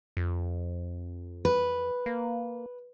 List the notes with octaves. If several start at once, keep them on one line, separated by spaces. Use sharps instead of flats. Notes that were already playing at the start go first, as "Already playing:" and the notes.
F2
B4
A#3